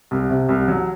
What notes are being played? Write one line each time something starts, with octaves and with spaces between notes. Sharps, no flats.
C2
C3
C2
F#3